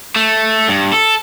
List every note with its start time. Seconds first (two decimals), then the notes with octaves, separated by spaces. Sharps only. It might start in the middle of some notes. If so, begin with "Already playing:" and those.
0.16 A3
0.68 G2
0.93 A4